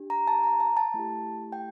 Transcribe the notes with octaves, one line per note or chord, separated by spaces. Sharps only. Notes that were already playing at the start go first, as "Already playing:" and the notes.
Already playing: D4 G4
A#5
A5
A#5
A5
A5
A3 E4 G4
G5